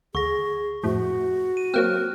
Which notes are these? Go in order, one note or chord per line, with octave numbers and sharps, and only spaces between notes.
D2 G#4 C#6 A#6
F2 A2 F#4
D#7
F#3 A#3 C4 F6 F#6